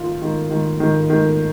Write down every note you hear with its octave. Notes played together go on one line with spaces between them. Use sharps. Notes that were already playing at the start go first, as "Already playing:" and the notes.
Already playing: D#3 F4
D#3
D#3
D#3
D#3